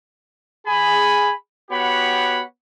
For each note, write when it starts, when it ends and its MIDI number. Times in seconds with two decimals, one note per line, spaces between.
0.67 1.33 68
0.67 1.33 80
0.67 1.33 83
1.71 2.42 59
1.71 2.42 66
1.71 2.42 67
1.71 2.42 73
1.71 2.42 78
1.71 2.42 83